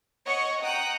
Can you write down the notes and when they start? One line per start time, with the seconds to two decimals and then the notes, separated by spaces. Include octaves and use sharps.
0.24 C#5 D#5 F#5 C#6
0.63 F#5 G5 A#5 D#6 F#6